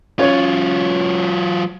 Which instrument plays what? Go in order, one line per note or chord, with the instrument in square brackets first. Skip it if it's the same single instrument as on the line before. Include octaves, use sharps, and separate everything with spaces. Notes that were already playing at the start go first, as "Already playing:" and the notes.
[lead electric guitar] F#3 F4 [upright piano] C#4 C#5